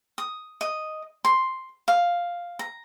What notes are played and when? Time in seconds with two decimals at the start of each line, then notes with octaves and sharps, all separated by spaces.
0.18 D#6
0.61 D#5
1.25 C6
1.88 F5
2.59 A#5